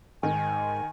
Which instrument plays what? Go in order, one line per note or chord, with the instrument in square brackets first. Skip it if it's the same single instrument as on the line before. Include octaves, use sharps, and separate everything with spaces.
[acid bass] G#2 [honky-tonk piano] D#3 [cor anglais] G#5